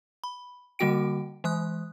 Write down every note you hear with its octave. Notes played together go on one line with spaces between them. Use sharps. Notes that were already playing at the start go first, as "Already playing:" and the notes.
B5
D3 G3 A#3 F#4 G5 D7
E3 G#3 D#6 F#6